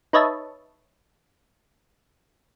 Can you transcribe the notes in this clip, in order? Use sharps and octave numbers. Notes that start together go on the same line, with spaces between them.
D#4 B4 C#5 D#5 E5 A5